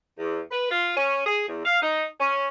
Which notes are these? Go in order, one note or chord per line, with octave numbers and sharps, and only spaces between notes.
E2
B4
F4
C#4
G#4
E2
F5
D#4
C#4